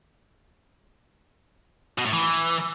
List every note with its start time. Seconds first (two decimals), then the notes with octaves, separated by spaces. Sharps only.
1.98 B2
2.06 A2
2.13 E3